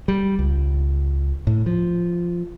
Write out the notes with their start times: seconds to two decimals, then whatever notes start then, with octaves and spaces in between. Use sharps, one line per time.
0.08 G3
0.39 C#2
1.47 A2
1.66 F3